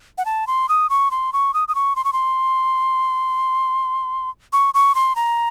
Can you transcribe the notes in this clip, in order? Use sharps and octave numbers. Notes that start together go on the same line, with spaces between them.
F#5
A5
C6
D#6
C#6
C6
C#6
D#6
D#6
C#6
C6
C#6
C6
C#6
C#6
C6
A#5